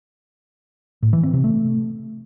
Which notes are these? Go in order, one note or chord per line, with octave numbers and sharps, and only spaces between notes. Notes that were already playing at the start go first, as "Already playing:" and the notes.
A2
E3
C4
C3
A3